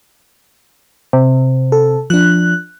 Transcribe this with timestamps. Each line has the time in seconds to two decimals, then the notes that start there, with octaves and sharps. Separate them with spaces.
1.13 C3
1.72 A4
2.10 F3 D4 F#6